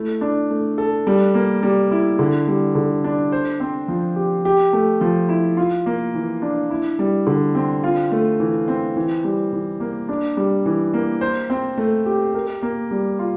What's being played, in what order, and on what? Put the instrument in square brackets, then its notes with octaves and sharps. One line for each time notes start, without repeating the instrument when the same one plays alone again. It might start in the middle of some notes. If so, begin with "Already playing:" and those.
Already playing: [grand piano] A3 E4
D4
A3
A4
G3
A#3
G3
E4
D3
G3
D3
D4
C5
C4
F3
G4
G4
A3
F3
E4
F4
A#3
E3
D4
E4
G3
D3
C4
F4
A3
E3
C4
E3
G3
E3
A#3
D4
G3
E3
A#3
C5
C4
A3
G4
A#4
A#3
G3
F4